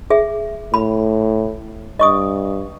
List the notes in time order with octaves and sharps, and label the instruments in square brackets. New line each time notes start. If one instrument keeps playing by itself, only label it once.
[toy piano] G#4 E5
[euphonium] A2 [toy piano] B5
[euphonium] G2 [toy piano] D#5 C#6 D#6